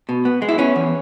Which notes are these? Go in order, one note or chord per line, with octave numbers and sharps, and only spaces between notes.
B2
B3
G#3
E4
B3 C#4
E2